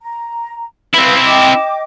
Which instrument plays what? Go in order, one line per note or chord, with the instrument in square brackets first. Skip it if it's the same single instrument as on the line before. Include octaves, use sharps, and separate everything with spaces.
[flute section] A#5
[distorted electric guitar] C4 E4 [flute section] B4 F5
[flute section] D#5 G5 D6